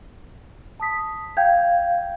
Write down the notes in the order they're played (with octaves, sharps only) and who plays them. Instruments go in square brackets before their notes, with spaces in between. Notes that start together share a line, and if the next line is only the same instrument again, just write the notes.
[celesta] A5 D#6 B6
[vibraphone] F5 [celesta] G5 G6 G#6